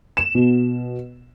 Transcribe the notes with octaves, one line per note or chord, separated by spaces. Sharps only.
E7
B2